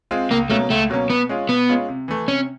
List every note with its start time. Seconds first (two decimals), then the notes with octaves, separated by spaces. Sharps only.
0.11 G#3 C4 F4
0.30 C#2 A#3
0.50 B2 F#3 A3 A#3 C#4
0.70 C#2 A3
0.90 B2 F#3 A#3 C#4
1.10 B2 B3
1.29 G#3 C#4 F4
1.49 B2 B3
1.69 G#3 C#4 F4
1.89 C3
2.08 E3 A3
2.28 C3 C#4